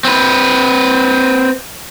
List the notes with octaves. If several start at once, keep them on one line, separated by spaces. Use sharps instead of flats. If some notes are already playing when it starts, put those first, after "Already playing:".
C4 B4